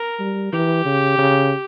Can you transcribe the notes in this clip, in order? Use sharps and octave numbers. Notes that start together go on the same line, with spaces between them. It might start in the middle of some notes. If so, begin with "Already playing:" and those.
Already playing: A#4
G3
E3 G4
C#3
C#3